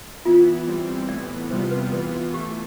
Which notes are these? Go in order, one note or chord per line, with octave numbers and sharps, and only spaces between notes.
E3 B3 E4 F4
E3 G3 C4
A2 E3 B3 D5
E2 C3 G3 B3 F4 C5
B4
E3 B3 F4 B4
E3 A3 G4